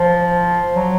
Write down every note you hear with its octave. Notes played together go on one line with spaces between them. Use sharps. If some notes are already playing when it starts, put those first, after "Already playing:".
Already playing: F3
F#3